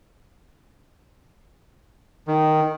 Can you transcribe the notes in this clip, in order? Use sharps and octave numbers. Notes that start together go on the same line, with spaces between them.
D#3